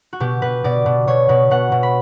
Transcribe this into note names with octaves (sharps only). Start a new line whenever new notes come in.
F#4
B2 G4
B2 B4
B2 D5
B2
B2 C#5
B2 B4
B2 F#5
B2
B5